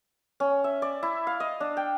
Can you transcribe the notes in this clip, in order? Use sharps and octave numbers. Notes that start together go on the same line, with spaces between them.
C#4
E5
D5
E4
F5
D#5
D4
G5